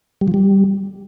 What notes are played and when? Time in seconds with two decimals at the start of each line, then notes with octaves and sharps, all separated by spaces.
0.21 G3
0.28 F3
0.34 G3